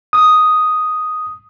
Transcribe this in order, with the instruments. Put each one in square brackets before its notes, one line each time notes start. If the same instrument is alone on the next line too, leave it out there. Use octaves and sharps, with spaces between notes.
[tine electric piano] D#6